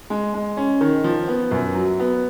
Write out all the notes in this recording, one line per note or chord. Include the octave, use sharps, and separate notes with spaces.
G#3
G#3
C#4
D#3
F3
B3
F#2
F#3
B3